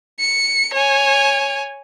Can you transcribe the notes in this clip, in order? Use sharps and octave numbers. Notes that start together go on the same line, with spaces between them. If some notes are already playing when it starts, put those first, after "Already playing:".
C#7
C#5 G#5